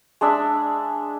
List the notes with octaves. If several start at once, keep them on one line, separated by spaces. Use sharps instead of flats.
G#3 D4 E5